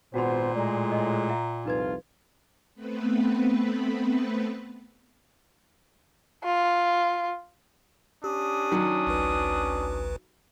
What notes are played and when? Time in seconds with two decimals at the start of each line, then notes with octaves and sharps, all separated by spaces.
0.14 G#1 A#2 B3 F#4 C5 F#5 C6
0.55 A2 G#3 D5 A#5
0.92 D#5
1.29 E5 F#5 A#5
1.65 C2 F2 D#4 F4 B4 G#6
2.75 A3 B3 C4 B4
6.44 F4
8.24 C#4 D4 G4 D#6
8.72 D#3 F#3
9.07 A1 D2 B4